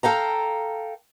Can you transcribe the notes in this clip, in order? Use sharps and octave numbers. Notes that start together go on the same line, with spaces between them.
A4 F5 G5 A#5